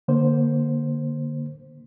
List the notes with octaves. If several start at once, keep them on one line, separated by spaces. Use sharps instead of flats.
D3 A#3 C5